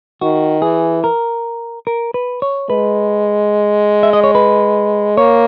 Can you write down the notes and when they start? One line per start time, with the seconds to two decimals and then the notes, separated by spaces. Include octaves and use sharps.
0.21 D#3 F#4
0.62 E3 G#4
1.04 A#4
1.87 A#4
2.14 B4
2.42 C#5
2.70 G#3 B4
4.03 E5
4.13 D#5
4.24 C#5
4.35 B4
5.17 A#3 C#5